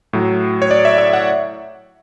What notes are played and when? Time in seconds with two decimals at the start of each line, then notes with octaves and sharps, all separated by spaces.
0.13 A2 F#3
0.62 C#5
0.71 D5
0.85 E5
0.98 E5
1.13 F#5